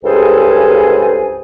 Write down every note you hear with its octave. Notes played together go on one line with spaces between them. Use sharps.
C#2 G2 G#4 A4 C5 G#5